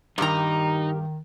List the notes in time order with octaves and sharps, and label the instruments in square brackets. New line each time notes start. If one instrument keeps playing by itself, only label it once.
[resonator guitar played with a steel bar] G2 A#5 [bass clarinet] D#3 [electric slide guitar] D#4 [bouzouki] G4 A#4